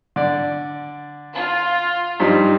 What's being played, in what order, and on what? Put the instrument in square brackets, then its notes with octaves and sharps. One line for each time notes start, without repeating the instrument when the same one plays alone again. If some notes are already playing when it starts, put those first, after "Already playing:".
[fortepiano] D3 D5
[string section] F4
[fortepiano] G2 F3 D#4